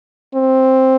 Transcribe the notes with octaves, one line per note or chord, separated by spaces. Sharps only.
C4